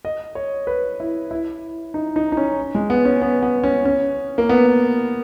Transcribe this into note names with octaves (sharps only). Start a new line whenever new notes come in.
D#5
C#5
B4
E4
E4
D#4
D#4
D#4
C#4
G#3
B3
C#4
B3
B3
C#4
C#4
A#3
B3